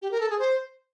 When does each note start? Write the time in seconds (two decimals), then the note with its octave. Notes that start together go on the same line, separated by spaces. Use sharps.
0.02 G4
0.11 A#4
0.21 A4
0.30 G#4
0.39 C5